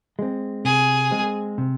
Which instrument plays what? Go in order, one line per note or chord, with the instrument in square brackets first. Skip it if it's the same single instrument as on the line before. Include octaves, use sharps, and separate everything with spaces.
[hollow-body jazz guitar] G#3 C4
[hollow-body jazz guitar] C3 [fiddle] G#4
[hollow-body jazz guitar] G#3 C4
C3